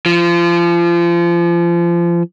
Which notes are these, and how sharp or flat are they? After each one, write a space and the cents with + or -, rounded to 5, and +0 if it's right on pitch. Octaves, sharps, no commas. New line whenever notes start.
F3 -30